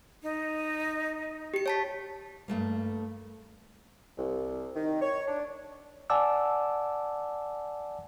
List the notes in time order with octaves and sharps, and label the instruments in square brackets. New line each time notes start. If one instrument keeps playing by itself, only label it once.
[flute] D#4
[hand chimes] G4 C#7
C#5 A5 B6
[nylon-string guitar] G2 A#2 A3 A#3
[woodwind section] C2
D#3
C#5
D4
[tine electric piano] D5 F#5 G#5 A5 D6 E6